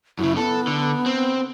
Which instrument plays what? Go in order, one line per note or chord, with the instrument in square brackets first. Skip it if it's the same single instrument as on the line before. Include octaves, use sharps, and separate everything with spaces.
[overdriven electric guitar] F#2 C#3 [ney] E4
[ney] B3 [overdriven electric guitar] A4
[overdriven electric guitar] D3
C4